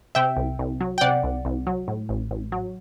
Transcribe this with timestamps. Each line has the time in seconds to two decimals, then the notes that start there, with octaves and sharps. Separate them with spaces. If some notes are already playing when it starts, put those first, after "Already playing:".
0.15 C3 E5 G5
0.37 C2
0.59 C2
0.81 F#3
0.98 G5
1.01 C3 D5 F#5
1.23 C2
1.45 C2
1.67 F#3
1.88 A2
2.09 A1
2.31 A1
2.52 F#3